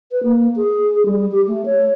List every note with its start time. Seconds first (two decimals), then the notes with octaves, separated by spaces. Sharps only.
0.12 B4
0.23 A#3
0.56 G#4
1.06 G3
1.32 G4
1.48 A3
1.66 C#5